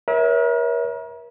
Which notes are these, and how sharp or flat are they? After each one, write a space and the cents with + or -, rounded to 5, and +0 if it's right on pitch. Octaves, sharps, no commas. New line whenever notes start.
A#4 +40 C#5 +0 E5 -25